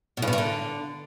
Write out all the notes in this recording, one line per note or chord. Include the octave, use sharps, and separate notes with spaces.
B2
G2
B2
G2
D3